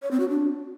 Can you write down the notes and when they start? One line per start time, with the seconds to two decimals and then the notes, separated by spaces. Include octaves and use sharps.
0.02 C#5
0.11 C4
0.20 F#4
0.29 D4